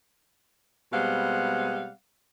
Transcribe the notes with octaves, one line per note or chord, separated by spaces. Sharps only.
B2 G3 G#3 C4 F5 F#5